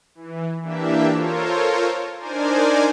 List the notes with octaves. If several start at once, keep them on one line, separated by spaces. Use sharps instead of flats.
E3
E3 A#3 D4 G4 E5
F4 A4 A#4 C5 C#5
D4 D#4 A#4 C5 D5 G#5